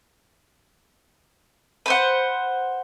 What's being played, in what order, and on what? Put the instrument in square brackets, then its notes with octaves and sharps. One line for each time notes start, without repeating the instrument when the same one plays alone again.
[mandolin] B4 C5 F#5